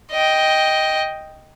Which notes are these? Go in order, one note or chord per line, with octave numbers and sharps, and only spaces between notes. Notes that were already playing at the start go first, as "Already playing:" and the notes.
D#5 G5